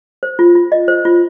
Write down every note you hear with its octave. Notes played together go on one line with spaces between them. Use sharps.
C5
F4
F4
D#5
C5
F4